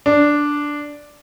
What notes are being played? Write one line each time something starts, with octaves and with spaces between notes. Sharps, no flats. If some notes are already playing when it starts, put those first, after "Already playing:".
D4